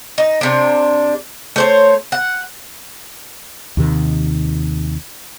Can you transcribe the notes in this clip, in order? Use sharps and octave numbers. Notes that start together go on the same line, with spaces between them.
D#4
C3 D4
A3 C5 C#5
F#5
D#2 C3 D#3